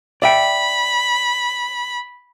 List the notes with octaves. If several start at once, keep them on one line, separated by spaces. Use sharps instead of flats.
D5 E5 G5 B5